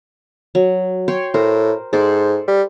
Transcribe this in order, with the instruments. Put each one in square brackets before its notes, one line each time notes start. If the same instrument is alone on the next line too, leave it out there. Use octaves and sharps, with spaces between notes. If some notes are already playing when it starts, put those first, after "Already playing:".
[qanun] F#3
C#5 G5 C6
[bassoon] A2 [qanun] A#4 C5
[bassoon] G#2 [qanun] A4 C5 D5
[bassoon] G3